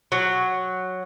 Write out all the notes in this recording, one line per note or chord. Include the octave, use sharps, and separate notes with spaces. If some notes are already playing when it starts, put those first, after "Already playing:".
F#3